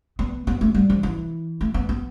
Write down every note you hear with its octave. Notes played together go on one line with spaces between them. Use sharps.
B3
B3
A3
G3
F3
E3
A3
B3
B3